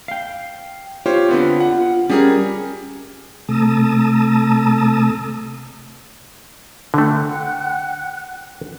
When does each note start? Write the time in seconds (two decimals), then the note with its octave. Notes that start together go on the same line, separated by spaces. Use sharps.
0.08 F5 G5
1.06 F4 G4 C5 C#5
1.29 D3 B3 C4
1.60 F#5
2.10 G3 C#4 G#4 A#4
3.49 C3 A3 A5 A#5 D#6 E6
6.94 D3 A3 F#5 G5 F#6